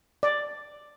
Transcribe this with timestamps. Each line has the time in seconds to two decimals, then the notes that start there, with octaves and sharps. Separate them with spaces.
0.23 D5